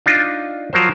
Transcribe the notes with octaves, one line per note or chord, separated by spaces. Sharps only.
D4 D#4 F4
F3 F#3 A#4 C5